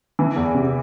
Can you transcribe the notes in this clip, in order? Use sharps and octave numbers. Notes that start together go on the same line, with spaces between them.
E3
E2
C3